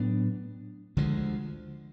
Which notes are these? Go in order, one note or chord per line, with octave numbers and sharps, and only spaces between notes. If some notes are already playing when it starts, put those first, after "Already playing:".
Already playing: A2 F#3 B3 D4
D2 D3 F3 G#3